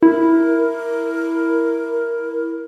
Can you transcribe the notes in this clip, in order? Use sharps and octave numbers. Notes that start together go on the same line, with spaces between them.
E4 A#4